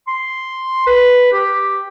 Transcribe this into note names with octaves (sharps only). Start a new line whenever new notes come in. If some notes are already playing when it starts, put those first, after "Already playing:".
C6
B4
G4